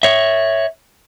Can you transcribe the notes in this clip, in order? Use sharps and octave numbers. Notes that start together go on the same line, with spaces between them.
C#5 E5